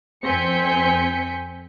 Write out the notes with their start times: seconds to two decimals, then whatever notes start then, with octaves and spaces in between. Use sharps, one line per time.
0.24 F2 C4 G#5 G6 B6 C#7